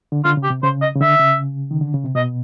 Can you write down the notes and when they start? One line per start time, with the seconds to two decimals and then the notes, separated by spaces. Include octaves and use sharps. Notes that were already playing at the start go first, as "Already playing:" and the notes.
0.12 D3
0.24 D3 F4
0.37 C#3
0.43 G4
0.50 C3
0.63 C#3 C5
0.82 D#5
0.96 C#3
1.01 D3 E5
1.20 C#3
1.71 D#3
1.81 D3
1.94 C#3
2.04 C3
2.15 B2 D#5